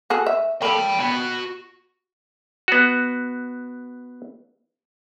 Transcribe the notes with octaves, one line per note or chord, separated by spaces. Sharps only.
F#4 G#4 A4
E5
A#3 A4 G5 B5
F#4 B5
B3 F#4